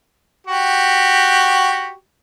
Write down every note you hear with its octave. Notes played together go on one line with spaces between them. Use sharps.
F#4 G4